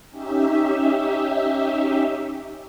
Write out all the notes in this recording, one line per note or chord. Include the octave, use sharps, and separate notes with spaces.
C#4 D#4 G4 E5